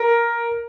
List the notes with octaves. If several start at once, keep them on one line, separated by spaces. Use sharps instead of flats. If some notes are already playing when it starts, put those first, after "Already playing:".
Already playing: A#4